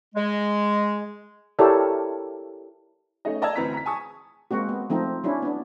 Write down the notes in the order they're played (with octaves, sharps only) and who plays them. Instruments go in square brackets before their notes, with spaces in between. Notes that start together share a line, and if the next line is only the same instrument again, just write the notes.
[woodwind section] G#3
[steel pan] E4 G4 A4 A#4 C#5 D5
[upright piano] A3 C#4 D#4 D#5
D5 D#5 A5 A#5 E6 G#6
D2 E3 C4 B4 A#5 B6
A#5 B6
G#5 A5 C#6 D#6
[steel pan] G#3 A#3 C4 F#4
B3
F3 A3 C4 D#4
F#3 C#4 D4 E4 F#4
B3 D4